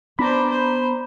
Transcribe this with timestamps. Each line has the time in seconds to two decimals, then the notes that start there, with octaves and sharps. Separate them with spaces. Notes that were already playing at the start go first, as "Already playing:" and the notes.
0.19 B3 D4 C5 A#5 B5
0.50 C5